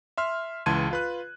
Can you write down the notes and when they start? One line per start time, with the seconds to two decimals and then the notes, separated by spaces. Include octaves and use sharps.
0.17 E5 C6 F6
0.66 C#2 E3 A5 C6 G#6 D#7
0.91 F4 B4 F#6